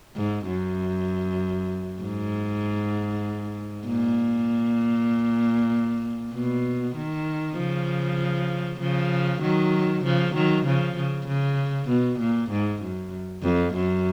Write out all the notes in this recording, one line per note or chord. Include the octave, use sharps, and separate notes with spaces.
G#2
F#2
G#2
A#2
B2
D#3
C#3 F3
C#3 F3
D#3 F#3
C#3 F3
D#3 F#3
C#3 F3
C#3
C#3
B2
A#2
G#2
F#2
F2
F#2